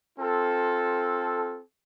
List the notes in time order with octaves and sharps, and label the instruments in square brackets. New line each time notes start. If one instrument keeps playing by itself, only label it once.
[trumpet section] C4 F4 A4